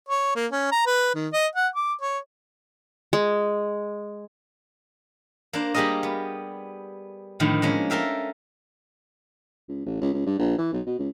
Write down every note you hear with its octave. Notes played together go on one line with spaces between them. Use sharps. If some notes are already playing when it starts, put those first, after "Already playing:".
C#5
A#3
C#4
A#5
B4
D#3
D#5
F#5
D6
C#5
G#3
A#3 D4 C5
G3 A#3 G4 G#4 A#4 D#5
B3
A2 D3 D#3 F3
G#3 A#3 C#4
A4 A#4 E5 F5 G5
C#2
A1
C#2
C#2
G2
A#1
E3
B1
B2
C#2